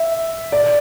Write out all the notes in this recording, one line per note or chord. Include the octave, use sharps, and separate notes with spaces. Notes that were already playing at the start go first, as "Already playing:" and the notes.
Already playing: E5
D5